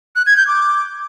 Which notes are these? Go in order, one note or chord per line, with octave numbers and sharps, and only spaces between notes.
F#6
G#6
G6
D6